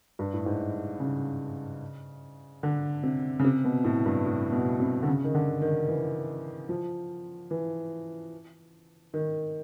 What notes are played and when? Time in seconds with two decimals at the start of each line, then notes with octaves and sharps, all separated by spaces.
0.19 G2
0.34 A2
0.46 G#2
1.00 C#3
2.63 D3
3.03 C3
3.39 C#3
3.44 C3
3.65 B2
3.84 A2
4.06 G2
4.26 A2
4.52 B2
4.80 C3
5.03 D3
5.08 C#3
5.24 D#3
5.35 D3
5.62 D#3
5.88 E3
6.69 F3
7.51 E3
9.14 D#3